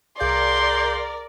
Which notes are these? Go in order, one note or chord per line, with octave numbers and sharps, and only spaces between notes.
C2 G#4 A#4 D5 F5 C6 G6